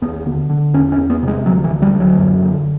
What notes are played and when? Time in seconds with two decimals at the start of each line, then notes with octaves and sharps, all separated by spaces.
0.02 D#2 B3
0.26 D3
0.50 D3
0.74 E2 C#4
0.92 C#4
0.98 E2
1.10 B3
1.22 C3
1.28 G#3
1.46 D2 F#3
1.64 E3
1.70 D2
1.82 G3
1.94 D2
2.00 F#3
2.18 F#2
2.42 D3